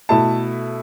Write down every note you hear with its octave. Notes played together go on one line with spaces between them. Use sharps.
B2 A3 E4 A5